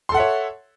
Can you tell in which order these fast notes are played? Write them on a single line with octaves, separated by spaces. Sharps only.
C6 A4 F#5 E5 C#5